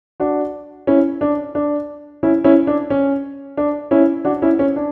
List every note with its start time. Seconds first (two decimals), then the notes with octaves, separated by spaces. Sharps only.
0.20 D4 F#4
0.87 C#4 E4
1.21 D4
1.55 D4
2.23 C#4 E4
2.44 C#4 E4
2.67 D4
2.90 C#4
3.57 D4
3.91 C#4 E4
4.25 D4 F#4
4.42 C#4 E4
4.59 C#4
4.76 D4